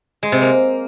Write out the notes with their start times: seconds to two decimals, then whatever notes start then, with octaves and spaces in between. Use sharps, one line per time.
0.23 G#3
0.32 C3
0.42 A#3